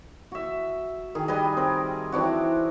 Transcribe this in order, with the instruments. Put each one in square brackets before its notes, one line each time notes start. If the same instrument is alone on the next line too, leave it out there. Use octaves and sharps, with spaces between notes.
[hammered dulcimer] F#4 E5
D#3 G#4
G3 G#4 B4 D#5
C4 A#4
E3 C4 D4 F#4